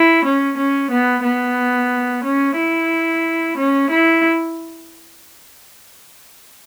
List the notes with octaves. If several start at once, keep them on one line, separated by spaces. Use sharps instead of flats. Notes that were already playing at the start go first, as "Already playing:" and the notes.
Already playing: E4
C#4
C#4
B3
B3
C#4
E4
C#4
E4